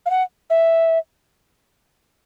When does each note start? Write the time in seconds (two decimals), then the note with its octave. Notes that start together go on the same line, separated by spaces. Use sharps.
0.06 F5
0.10 F#5
0.50 E5